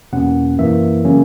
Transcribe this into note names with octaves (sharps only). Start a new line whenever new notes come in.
E2 B2 A#3 C#4 F#5
F#2 E3 A#3 E5
C#3 F#3 A#3 C#4